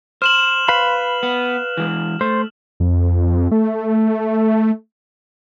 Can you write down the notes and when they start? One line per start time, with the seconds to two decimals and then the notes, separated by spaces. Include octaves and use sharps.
0.22 C5 F6 E7 F#7
0.68 B4 F5 B5 F#7
1.23 B3
1.77 E3 G#3
2.21 A3 C5
2.80 F2
3.52 A3